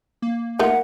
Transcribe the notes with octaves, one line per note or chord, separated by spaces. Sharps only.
A#3
A3 D#4 F4 A#4 F#5